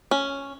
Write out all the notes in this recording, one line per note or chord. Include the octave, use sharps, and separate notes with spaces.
C#4